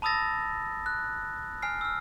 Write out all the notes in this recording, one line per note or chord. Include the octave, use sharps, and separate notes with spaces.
A5 B5 D#6 E6 A6 A#6
F#6
G#5 F6 C7
E6 F6